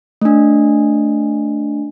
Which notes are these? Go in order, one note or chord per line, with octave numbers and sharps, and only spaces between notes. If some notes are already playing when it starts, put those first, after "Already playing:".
A3 D4